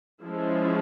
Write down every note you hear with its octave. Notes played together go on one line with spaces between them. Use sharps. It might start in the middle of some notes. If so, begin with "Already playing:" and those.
F3 G#3 C#4 E4